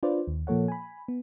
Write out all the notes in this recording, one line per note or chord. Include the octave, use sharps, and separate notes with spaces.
D4 F4 B4 C5 D5
D#2
A#2 F3 A#3 A4 C#5 F#5
G#5 B5
B3